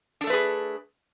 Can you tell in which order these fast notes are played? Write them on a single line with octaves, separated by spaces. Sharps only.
D4 A4 A3 B4 G#4